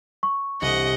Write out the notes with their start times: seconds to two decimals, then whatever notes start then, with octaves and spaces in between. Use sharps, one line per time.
0.23 C#6
0.62 C2 D#5 F#5